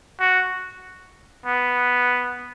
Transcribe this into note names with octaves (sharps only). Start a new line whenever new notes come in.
F#4
B3